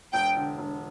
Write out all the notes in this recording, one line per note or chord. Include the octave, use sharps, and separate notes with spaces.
E1 G5
D3
E1